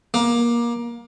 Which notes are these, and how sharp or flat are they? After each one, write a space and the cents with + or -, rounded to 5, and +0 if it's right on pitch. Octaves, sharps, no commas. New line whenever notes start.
A#3 +25